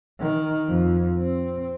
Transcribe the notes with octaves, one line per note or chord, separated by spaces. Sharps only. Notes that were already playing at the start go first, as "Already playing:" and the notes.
D#3
F2
C4